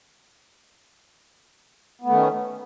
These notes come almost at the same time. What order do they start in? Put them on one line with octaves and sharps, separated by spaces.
B3 A3 D#3 C#4